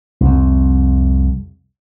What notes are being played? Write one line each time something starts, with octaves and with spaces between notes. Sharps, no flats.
C2 F2